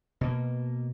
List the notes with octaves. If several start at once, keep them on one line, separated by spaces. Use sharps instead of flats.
B2 A#3